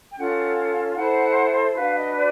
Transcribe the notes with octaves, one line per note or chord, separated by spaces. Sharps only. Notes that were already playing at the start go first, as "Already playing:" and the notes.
G5
C#4 F4 A4 F#5
E4 A4 C5 F#5
D4 F#4 B4 F5
D#5
D5